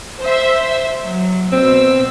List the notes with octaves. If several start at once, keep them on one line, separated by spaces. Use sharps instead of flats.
C5 E5
F#3
B2 C4 E6